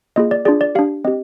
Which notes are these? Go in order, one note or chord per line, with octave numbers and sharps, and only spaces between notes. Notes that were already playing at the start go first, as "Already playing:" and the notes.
A#3 F4 G#4 D#5
D5
D4 F4 G#4 D5
D5
D4 G4 F5
C4 G4 D#5